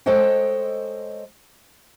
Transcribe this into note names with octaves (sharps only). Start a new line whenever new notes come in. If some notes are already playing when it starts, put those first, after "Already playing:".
G#3 A4 C5 C#5 D#5 G5